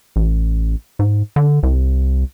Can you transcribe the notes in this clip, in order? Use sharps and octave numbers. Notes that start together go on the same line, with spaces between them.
A1
G#2
D3
C2